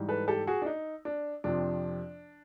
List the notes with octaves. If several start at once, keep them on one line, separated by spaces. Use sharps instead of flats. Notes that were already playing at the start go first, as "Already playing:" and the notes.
Already playing: G#2 E3 G3
A4 B4
G4 A4
F#4 G#4
D4
D#4
D4
F2 C3 F3 D4